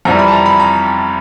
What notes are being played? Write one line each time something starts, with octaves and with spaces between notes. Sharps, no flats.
F2 C3 E3 G3 A#5
B5
A5
A#5
B5
A#5